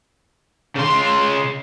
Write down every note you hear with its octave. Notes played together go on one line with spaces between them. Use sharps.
C#3 C6